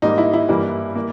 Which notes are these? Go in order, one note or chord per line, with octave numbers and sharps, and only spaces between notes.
G#2 G3 A#3 D#4
E4
E4
G2 E3 G3 A#3
A#3